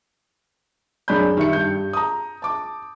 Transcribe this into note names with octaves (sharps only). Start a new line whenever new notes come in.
F#2 D4 G#4 B5 G6
D#3 G3 E5 C#7
G2 G6
A#5 D#6
A5 D6